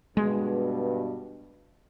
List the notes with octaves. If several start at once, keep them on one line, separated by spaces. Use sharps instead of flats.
G2 B2 G#3